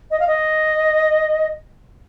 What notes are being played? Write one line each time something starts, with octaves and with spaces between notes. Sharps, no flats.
D#5
F5
D#5